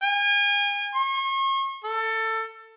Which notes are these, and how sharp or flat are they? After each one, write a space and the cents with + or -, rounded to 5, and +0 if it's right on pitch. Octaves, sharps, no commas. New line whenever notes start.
G#5 -35
C#6 -40
A4 +20